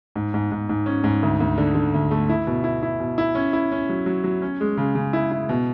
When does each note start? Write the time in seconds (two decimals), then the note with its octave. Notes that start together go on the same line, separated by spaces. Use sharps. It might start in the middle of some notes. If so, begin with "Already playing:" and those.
0.16 G#2
0.34 G#2
0.52 G#2
0.69 G#2
0.86 C#4
1.04 G#2
1.23 D2
1.40 D2
1.58 D3
1.75 D3
1.94 D2
2.11 A3
2.29 E4
2.47 B2
2.64 E4
2.83 E4
3.00 B2
3.18 E4
3.35 C#4
3.53 E4
3.72 C#4
3.89 F#3
4.06 F#3
4.24 F#3
4.42 C#4
4.61 G#3
4.77 C#3
4.95 C#3
5.13 E4
5.32 E4
5.49 B2